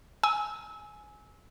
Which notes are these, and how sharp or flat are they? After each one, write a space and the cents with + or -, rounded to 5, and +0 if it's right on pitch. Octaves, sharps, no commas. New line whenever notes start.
G#5 +10 E6 -25